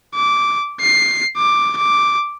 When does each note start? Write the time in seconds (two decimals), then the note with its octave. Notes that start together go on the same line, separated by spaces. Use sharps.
0.15 D6
0.82 C7
1.38 D6
1.77 D6